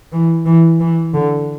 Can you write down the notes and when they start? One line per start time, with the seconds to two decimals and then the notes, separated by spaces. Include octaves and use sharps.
0.12 E3
0.46 E3
0.80 E3
1.14 D3